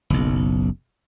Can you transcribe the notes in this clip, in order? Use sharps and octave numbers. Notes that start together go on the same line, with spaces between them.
F#1 B1